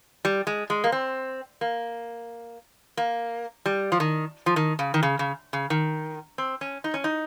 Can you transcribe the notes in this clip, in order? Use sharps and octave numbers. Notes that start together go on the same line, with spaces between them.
G3
G#3
G#3
A#3
C4
A#3
A#3
G3
F3
D#3
F3
D#3
C#3
D#3
C#3
C#3
C#3
D#3
C4
C#4
D#4
C#4
D#4